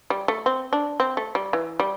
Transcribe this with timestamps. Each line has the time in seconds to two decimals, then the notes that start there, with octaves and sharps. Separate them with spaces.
0.10 G3
0.28 A3
0.46 C4
0.73 D4
1.00 C4
1.17 A3
1.35 G3
1.53 E3
1.80 G3